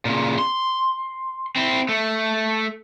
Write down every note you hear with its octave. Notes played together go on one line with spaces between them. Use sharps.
A#2 C#3
C6
C4 E4
A3